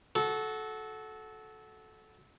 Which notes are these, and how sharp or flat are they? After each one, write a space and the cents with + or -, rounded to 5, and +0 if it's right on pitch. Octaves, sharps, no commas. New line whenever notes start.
F#4 +0 A4 -20